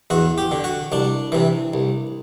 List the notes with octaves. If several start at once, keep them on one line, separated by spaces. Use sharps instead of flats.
E2 F#4
G4
D3
F#4
C2 D4
C3 E3
C2